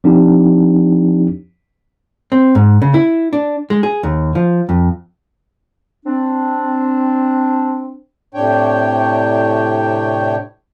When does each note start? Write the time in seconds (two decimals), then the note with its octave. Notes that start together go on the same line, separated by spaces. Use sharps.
0.04 F3 C4 D4 D#4 G4
2.32 C4
2.55 G#2
2.82 C#3
2.94 E4
3.33 D4
3.70 G#3
3.83 G#4
4.03 D#2
4.35 F3
4.69 F2
6.06 C4 D4
8.34 A2 C3 D4 C#5 G5